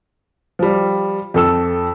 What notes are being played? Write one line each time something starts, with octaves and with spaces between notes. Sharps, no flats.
F3 G3
F2 A4 E6